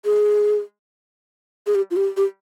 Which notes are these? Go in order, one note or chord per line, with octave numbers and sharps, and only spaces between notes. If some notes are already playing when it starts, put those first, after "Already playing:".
G#4
G#4
G4
F4
G4
G4